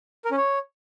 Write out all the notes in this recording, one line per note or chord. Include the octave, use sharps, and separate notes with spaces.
A#4
C#4
C#5